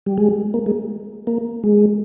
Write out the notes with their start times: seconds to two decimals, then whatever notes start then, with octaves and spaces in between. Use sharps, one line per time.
0.06 G3
0.18 G#3
0.54 A#3
0.66 G#3
1.27 A#3
1.64 G#3